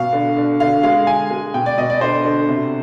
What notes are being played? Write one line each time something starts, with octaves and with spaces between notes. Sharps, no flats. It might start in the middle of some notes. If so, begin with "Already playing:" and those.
Already playing: B2 F5
D3
D3
D3 F5
G#3 F5
D3 G#5
G#3
B2 G5
D5
B2 D#5
D5
D3 C5
D3
C3